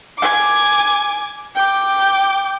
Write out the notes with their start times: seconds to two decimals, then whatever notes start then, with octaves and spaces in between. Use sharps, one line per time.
0.18 G#5 D6
1.55 G5 D6